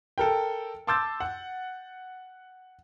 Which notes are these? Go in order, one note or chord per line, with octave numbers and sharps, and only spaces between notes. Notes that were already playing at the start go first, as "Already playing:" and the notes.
A4 A#4 G5
A5 C6 D6 E6 G6 A6
F#5